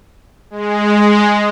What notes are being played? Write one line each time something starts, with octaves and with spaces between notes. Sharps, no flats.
G#3